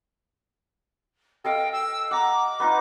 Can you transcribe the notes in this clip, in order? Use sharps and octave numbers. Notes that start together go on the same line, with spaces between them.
A4 D#5 F5 G5
E6
F#5 A#5 D6
B3 D#4 F4